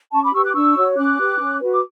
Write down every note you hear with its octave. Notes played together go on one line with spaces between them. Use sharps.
C#4 A5 C#6
B5 D6
G4 B4 C#6 E6
D6 F#6
D4 C#6 E6
F#4 C#5
C#4 D6 F#6
G4 B4
C#4
F#4 B4
D6